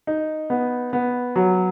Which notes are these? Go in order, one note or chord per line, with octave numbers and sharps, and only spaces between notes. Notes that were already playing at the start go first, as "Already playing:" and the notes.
D#4
B3
B3
F#3